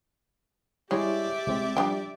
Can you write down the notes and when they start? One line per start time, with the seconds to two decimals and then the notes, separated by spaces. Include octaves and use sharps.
0.91 G3 G#3 E4 G4 C#5 D5 E5
1.47 C2 G#3 C4
1.77 F3 G3 D4 G5